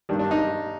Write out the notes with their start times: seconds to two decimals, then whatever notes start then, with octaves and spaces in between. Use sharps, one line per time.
0.09 G2 D#3 G3 D4
0.19 D4
0.31 D#4